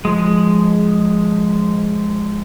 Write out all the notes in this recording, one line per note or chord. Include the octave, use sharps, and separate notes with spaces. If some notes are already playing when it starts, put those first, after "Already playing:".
F3 G#3